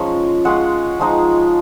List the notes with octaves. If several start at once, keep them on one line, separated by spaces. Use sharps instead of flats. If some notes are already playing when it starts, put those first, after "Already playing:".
Already playing: F3 G#3 C#4 D#4
G#3 C#4 F4 F#5
F3 G#3 D#4